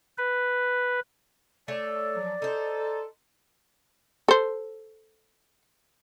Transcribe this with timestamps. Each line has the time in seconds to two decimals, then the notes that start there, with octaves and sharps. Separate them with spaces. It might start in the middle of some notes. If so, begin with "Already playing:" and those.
0.18 B4
1.68 A3 A4 C#5 D5
2.15 F3 F#3
2.42 D#4 A4 C5
4.28 A4 C5